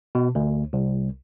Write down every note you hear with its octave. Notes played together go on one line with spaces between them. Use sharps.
B2
D2
C2